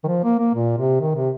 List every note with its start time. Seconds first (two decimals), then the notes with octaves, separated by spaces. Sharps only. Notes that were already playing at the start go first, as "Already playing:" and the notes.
0.04 D#3
0.08 F3
0.24 A#3
0.39 A#3
0.54 A#2
0.77 C3
1.00 D#3
1.15 C3